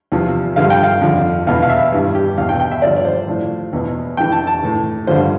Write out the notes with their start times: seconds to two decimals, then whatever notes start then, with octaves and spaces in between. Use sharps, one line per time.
0.12 E2 C3 F3
0.56 G2 D3 F3 F5
0.70 G5
0.83 F5
1.02 F2 D3 F3
1.47 E2 B2 F5
1.63 F5
1.69 E5
1.92 G2 E3
2.15 G4
2.37 E2 F5
2.41 B2
2.49 G5
2.60 G5
2.71 E5
2.82 G2 D3 F3 D5
2.96 D5
3.05 C5
3.28 A2 F3
3.73 E2 B2
4.17 F2 E3 G5
4.32 A5
4.47 A5
4.63 A2 E3
5.07 G2 D3 F3 C5